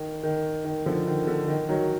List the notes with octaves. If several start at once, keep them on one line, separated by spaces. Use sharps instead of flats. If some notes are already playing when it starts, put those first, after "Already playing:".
Already playing: D#3
D#3
D#3
D3 F3
D#3
D3
D#3
D#3 F#3